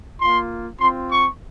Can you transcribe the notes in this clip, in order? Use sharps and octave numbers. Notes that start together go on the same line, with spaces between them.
A#3 F4 C6
C4 F4 C6
C#6